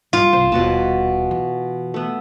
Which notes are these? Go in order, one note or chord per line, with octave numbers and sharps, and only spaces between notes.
G2 F4
C2 C5
D#1 B2 A#3 F#4 A5
E3
A3 B3